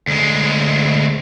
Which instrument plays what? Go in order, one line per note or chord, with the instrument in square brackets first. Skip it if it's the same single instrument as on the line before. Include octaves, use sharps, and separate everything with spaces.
[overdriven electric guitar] D2 G#3